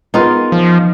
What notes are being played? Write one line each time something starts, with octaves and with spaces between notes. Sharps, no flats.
B3 D#4 F4 G#4 A#4
F3